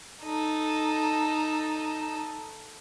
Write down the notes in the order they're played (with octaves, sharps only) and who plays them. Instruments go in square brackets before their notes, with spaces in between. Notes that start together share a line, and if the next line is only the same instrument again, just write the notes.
[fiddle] D#4 A4